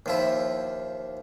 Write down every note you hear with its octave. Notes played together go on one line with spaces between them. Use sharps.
D#2 F3 E4